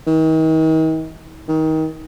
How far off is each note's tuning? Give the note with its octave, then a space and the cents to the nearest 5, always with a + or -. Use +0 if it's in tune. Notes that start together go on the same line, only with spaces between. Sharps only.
D#3 +40
D#3 +25